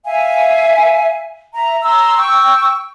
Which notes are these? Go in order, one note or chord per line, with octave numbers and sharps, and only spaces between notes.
E5 F5 G#5
E5 A#5
A#5 C6 E6
G5 C#6 E6